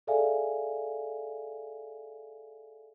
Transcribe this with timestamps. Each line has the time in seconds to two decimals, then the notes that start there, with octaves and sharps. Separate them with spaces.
0.07 G#4 A4 D5 E5 F5 G#5